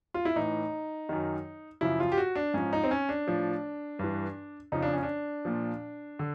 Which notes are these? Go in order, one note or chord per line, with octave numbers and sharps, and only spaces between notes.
F4
E4
A2 E3 D#4
F#2 D#3
F#2 C#3 F3 E4
F4
G4
F#4
D4
G#2 F3 C#4
D#4
C4
C#4
D4
A2 F3
G2 E3
F2 C#3 F3 D#4
D4
C#4
D4
A#2 F3
D3